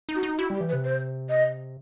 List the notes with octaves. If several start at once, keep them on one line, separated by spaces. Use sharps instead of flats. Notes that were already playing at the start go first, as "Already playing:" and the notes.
D#4
F#4
D#4
E4 F#4
G3 G4
E3
B4
C3
C5
D#5